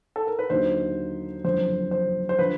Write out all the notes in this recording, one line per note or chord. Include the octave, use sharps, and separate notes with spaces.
A4
A#4
B4
D#2 D3 F#3 A#3 D#4 C5
F#1 F2 D3 C5
C5
C5
D3 F3 B4